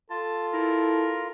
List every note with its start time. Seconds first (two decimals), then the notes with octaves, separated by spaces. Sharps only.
0.10 F4 A4 A5
0.53 E4 A#4